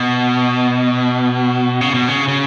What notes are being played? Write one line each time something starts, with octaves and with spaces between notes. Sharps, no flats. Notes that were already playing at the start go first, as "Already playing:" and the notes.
Already playing: B2
C#3
B2
C#3
C#3